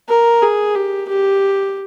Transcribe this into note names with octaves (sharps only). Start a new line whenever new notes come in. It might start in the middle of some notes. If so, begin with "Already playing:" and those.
A#4
G#4
G4
G4